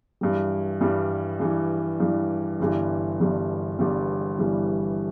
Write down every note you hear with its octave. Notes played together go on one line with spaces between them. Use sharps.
G2 E3 G3
G2 E3 G3
G2 E3 G3
G2 E3 G3
G1 G2 E3 G3
G1 G2 E3 G3
G1 G2 E3 G3
G1 G2 E3 G3